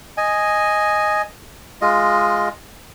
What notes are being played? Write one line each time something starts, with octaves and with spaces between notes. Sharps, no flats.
D#5 G#5
G#3 F4 D#5